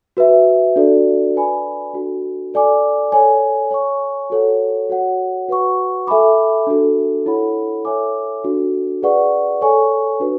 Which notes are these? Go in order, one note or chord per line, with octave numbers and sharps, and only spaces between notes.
F#4 B4 E5
D4 F#4 A4 D5
B4 D5 G#5 B5
D4 F#4 A4
A4 D5 G#5 D6
A4 C#5 G#5
C#5 G#5 C#6
F#4 A4 C#5 F#5
F#4 C#5 F#5
F#4 B4 F#5 C#6
A4 E5 G#5 B5 D6
D4 F#4 A4
E4 A4 C#5 F#5 B5
A4 C#5 E5 G#5 D6
D4 F#4 A4
G#4 B4 D5 F#5 C#6
A4 C#5 G#5 C#6
D4 F#4 B4